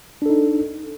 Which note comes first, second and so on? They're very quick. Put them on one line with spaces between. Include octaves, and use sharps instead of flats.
D4 A4 D#4